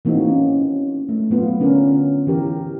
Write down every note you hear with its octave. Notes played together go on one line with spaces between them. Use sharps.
E3 A#3 C4 D#4 F#4
C#4
A3
F#3 B3 F4
D3 C#4 D4 F4 A#4
E3 G4 A#4